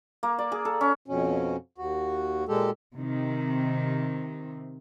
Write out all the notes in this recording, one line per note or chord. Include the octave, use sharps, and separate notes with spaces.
A#3
D5
G#4
A4
C#4
F2 B2 C#4
D#2 F#4
A#2 G#3 G4 A4
C3 D#3